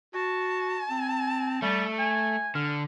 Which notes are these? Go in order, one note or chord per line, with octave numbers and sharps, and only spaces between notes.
F#4 A5
C4
G3 A3
G#5
D3 F6